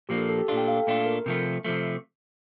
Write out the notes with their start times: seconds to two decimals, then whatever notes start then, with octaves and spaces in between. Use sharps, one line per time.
0.09 A#2 F3 A#3 D4 G4
0.18 A4
0.29 A4
0.38 G4
0.48 A#2 A3 D4 F4 A4
0.57 G5
0.68 F5
0.77 A4
0.87 A#2 A3 D4 F4
1.06 A#4
1.26 C3 F3 A3
1.65 C3 F3 A3